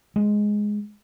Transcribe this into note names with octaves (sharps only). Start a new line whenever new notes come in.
G#3